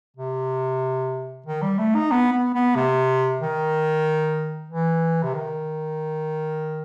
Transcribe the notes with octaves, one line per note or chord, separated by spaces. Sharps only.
C3
D#3
G3
A3
D#4
B3
B3
B3
C3
D#3
E3
C3
D#3